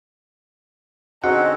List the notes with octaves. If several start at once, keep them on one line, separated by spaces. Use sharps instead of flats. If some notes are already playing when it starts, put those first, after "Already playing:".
D3 C4 C#4 D#4 F#4 G#4 F#5